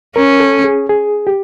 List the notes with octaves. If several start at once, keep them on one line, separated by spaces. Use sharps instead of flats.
C#4 A#4
A4
G#4
G#4
G4